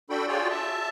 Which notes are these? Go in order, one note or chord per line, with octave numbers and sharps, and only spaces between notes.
D4 F#4 A4 G5 B5
F4 F#4 G#4 C#5 D5 G5
E5 A5